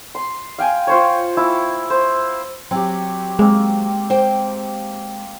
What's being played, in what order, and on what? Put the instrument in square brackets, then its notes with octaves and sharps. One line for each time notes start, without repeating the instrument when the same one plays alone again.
[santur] C6
F5 G5 G#5
F4 C5 C#5
A#3 E4 A5
C5
[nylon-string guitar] F#3 [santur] C4 G4
[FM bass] G#3 [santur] A#3 C4
[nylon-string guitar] C5 G5